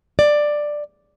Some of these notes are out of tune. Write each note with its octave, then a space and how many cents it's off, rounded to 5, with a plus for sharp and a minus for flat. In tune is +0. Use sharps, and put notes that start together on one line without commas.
D5 +10